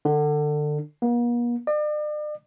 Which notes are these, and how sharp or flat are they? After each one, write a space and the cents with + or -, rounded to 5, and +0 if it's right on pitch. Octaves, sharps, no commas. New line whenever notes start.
D3 +25
A#3 +45
D5 +40